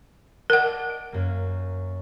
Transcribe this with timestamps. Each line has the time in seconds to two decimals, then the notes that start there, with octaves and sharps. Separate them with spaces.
0.50 A#4 D5 D#5 F#5 A5
0.89 D7
1.12 F#2 A#3